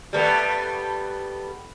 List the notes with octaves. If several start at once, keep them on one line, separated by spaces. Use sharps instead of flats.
G3 A3 B3